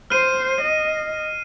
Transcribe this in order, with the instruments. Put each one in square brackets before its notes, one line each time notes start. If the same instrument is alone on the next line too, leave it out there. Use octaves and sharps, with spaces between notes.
[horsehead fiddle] C5 [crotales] F6 C7 D#7
[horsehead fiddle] D#5